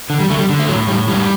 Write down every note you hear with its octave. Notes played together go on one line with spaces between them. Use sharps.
D3
G3
D3 A3
G3
D3
A3
A2 F#3
A2 G3
A2 G3